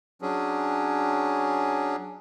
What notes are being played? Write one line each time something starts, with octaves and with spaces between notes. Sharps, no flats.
F#3 C#4 D4 G#4